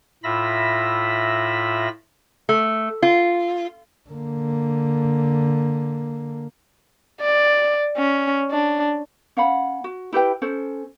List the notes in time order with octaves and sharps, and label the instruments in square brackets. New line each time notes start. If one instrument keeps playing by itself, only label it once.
[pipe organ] A2 F4 E5 B5 E6 A#6
[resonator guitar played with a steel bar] A3
F4
[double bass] D3 A#3
[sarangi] D5
C#4
D4
[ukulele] C#4 F5 F#5 B5
F#4
E4 G4 B4 G5
C#4 A4 C5